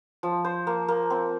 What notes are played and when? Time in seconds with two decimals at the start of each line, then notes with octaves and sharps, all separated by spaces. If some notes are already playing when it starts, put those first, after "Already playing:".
0.23 F3
0.45 C5
0.67 A#3
0.88 A#3
1.10 C4